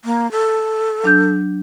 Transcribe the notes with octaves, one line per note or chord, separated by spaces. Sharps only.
A#3
A4
F#3 D4 G6